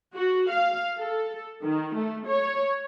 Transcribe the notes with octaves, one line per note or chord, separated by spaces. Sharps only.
F#4
F5
A4
D#3
A3
C#5